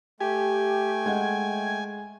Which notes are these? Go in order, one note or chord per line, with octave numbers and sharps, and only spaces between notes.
A3 G4 G5 G#5
G#3 F#5 G#6